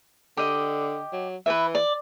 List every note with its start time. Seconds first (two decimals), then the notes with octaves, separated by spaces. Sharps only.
0.37 D3 G4 D#5
1.13 F#3
1.46 E3 B4 E5
1.75 D5